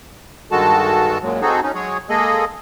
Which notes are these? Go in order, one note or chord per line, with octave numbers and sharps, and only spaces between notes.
G2 D#3 G#3 F#4 A4 A5
F#2 A#2 F#3 G#3
C4 D#4 F#4 G#4 A4
C#4 D#4
F#3 G#3 G#4 C#5
G#3 A#3 G#4 A4 D#5